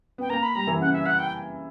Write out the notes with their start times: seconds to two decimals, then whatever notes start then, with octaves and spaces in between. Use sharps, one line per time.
0.18 B3 G5
0.30 A#3 A#5
0.43 B5
0.55 G3 A#5
0.67 E3
0.81 C#3 F#5
0.93 E5
1.06 F#5
1.19 G5